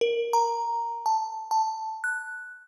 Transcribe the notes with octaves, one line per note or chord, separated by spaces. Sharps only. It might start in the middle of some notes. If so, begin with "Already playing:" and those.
A#4
A#5
A5
A5
F#6